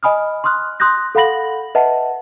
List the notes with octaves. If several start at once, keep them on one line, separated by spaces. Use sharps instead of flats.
D#5 G#5 B5 D#6 F6
C6 C#6 D#6 F6 F#6
C6 D#6 F#6 G6 A#6
A4 F5 F#5 B5 A#6 F#7
B4 D#5 E5 F#5 A5